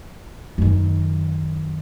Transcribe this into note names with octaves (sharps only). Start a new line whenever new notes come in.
F#2 D#3